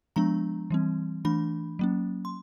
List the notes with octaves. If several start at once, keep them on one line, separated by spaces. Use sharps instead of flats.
F3 G#3 B3 D4 A#5
E3 G3 C4
E3 A3 D4 B5
F#3 A#3 C#4
C6